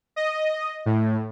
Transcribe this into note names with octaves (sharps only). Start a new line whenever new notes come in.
D#5
A2